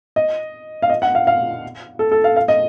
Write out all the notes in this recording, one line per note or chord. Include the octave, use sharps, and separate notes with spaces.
D#5
F5
D#5
F#5
F5
F5
A4
A4
F5
F5
D#5